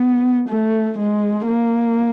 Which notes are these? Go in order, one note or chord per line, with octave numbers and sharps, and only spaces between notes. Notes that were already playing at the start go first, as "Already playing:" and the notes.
Already playing: B3
A3
G#3
A#3